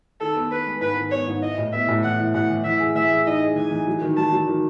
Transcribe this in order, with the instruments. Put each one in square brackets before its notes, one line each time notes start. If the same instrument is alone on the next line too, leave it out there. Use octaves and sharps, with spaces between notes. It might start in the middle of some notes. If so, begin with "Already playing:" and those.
[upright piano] D#3 [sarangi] A4
[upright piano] B3
[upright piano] B3 [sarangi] B4
[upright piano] G#3
[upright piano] G#2 [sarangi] B4
[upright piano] D#3
[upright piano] B3 [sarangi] C#5
[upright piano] G#2
[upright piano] E4 [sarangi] D#5
[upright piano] A2
[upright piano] B3 [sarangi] E5
[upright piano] A2
[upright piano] E3 [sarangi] F#5
[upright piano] E4
[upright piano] A2 [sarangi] F#5
[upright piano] E3
[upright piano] E3 [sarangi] E5
[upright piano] G#4
[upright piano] E3 [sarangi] E5
[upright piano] G#4
[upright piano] D#4 [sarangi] D#5
[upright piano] G#4
[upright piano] E3 [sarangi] G#5
[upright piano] E3
F#3
D#3
[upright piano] F#3 [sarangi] A5
[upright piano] F#3
D#3